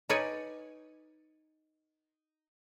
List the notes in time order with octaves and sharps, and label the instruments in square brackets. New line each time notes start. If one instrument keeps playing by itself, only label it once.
[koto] D#4 B4 C#5 D5 G#5